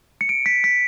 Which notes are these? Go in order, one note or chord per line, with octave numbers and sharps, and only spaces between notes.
C#7
D7
B6
B6